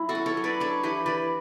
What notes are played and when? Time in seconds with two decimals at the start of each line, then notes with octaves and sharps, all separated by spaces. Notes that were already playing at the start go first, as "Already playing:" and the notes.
Already playing: F#3 E4
0.09 F#4 A4
0.15 C#4
0.26 A4 C#5
0.37 F#3
0.44 B4 D5
0.60 D4 A4 C#5
0.83 E3 G4 B4
1.06 E3 B4 D5